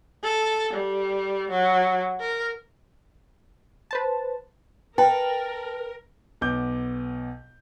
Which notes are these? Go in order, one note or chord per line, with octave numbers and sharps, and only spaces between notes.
A4
G3
F#3
A#4
B4 C5 A5
A#4 B4 G5 A5
B1 B3 D6 G6